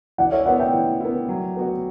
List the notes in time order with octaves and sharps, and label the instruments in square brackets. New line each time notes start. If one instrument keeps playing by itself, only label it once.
[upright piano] E3 [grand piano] D5 F#5
[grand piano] C#5 E5
[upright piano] B3 E4 [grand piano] D5 F#5
[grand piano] E5 G5
[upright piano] E3
B3 E4
F#3
B3 F#4